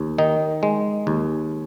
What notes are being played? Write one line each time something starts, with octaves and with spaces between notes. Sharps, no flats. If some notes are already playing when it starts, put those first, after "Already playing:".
Already playing: D#2
D#3 D#4
G#3
D#2